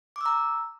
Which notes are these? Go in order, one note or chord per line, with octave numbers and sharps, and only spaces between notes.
A#5 D6 E6